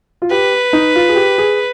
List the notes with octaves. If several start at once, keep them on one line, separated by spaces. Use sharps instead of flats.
F4
G4 B4
D#4
F4
G#4
G4
G#4